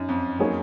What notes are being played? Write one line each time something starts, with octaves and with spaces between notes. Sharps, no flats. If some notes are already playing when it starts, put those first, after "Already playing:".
Already playing: F#2 D#4
F2
F#3 A#3 D#4 G#4 C#5